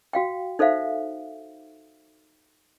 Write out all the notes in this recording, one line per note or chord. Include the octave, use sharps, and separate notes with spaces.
F#4 F5 G5
D#4 A4 C5 E5 F5